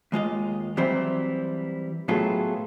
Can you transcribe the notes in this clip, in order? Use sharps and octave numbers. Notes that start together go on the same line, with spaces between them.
D#2 G#3 F4 D#5
E3 F#3 G3 C4 E4
A2 F#3 B3 F4 G#4 A4